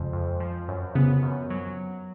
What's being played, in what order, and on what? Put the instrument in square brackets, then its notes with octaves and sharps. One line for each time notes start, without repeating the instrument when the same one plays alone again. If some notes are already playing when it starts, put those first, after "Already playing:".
Already playing: [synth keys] F2 F3 G#3 [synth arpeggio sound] C#3
[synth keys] F2
F3
F#2
[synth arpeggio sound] C#3 [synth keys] B3
[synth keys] F#2
F#3